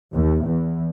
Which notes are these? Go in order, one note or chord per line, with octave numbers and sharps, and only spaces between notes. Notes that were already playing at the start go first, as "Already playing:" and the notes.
D#2
E2